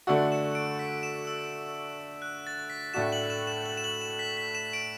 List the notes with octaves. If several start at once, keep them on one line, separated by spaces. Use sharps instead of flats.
D3 A3 D4 F#4 E6
E7
D7
B6
E7
E6
F#6
A6
B6
A2 A3 D4 F#4 E7
F#7
E7
E7
F#7
E7
F#7
E7
B6
B6
E7
D7